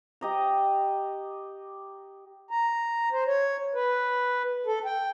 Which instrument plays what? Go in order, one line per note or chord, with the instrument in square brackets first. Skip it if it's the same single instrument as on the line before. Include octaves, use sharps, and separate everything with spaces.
[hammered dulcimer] G4 D#5 A#5
[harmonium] A#5
C5
C#5
B4
A4
G5